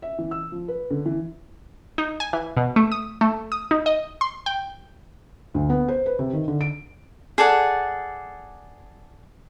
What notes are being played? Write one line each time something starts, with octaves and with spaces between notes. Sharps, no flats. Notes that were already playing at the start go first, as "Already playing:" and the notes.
E5
E3
E6
F3
B4
D3
E3
D#4
G#5
E3
B2
A3
D#6
A3
D#6
D#4
D#5
C6
G5
D2
B3
C5
B4
C3
D#3
D3
D7
G#4 A4 D5 F#5